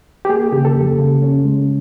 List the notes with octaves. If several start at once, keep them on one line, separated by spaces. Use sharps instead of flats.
G4
A#3 G#4
C#3 G4
A4
F2
C#3
C#4
G#3